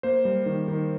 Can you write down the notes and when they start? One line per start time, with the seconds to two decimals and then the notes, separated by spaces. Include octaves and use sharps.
0.03 A#3 C5
0.25 G3
0.46 D#3
0.68 D#3